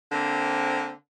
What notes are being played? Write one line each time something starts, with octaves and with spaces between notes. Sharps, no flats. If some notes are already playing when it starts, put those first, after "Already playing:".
D3 A#3 C4